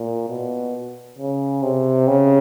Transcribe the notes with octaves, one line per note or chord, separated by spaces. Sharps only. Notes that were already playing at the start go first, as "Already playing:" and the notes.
Already playing: A#2
B2
C#3
C3
C#3